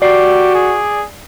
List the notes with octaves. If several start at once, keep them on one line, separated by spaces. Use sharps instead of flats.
F#4 G4 D5 C7
G#4